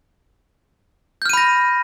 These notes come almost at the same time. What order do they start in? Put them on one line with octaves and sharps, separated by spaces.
G6 F6 D#7 B5 A#6